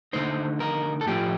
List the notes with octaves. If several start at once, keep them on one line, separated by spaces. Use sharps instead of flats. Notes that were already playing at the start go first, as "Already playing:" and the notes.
D3 A3 D#4 C5
A#4
A4
A2 F3 A3 G4